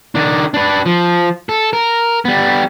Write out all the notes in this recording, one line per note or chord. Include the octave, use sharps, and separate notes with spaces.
D#3 D4
D4 B4
F3
A4
A#4
G3 B3